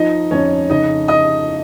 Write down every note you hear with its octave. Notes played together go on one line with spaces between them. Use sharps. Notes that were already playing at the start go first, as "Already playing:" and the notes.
Already playing: F3 D#4 D#5
F2 C#4 C#5
C#3 D#4 D#5
D#5 D#6